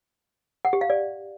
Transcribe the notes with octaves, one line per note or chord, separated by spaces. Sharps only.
F#5
G4
F5
D5